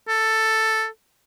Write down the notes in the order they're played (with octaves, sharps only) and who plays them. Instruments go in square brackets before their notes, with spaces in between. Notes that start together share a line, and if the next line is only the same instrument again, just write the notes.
[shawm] A4